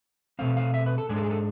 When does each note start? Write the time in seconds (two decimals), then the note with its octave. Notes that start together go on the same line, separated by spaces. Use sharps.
0.39 B2 A3 C4 F5
0.57 F5
0.74 E5
0.86 B4
0.98 A4
1.09 G#2 G#3 D4 G#4
1.16 A4
1.23 G#4
1.30 A4